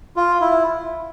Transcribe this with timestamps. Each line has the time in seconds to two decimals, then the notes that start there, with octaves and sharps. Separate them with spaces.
0.16 F4
0.41 E4